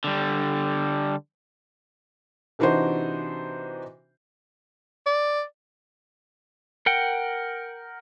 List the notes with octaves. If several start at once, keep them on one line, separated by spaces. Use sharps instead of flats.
D3 G3
C3 E3 D4 D#4 F#4 C5
D5
A#4 F#5 G5